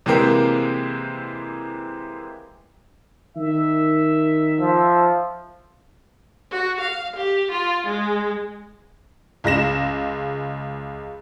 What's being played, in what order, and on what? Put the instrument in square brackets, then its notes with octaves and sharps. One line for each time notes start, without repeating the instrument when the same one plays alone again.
[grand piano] C3 E3 G#3 A#3 C4 A#4
[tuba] D#3 [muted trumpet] E5
[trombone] F3
[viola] F#4
F5
G4
F4
G#3
[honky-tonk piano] C#2 G#3 A#6 E7